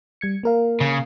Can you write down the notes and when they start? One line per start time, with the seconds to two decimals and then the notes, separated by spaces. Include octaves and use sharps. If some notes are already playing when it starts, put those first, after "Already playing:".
0.21 G3 G#6 C#7
0.43 A#3 A#4 F5
0.81 C#3